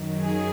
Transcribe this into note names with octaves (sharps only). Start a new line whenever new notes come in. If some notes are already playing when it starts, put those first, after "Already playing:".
Already playing: F#2 D#3 F#3
G#4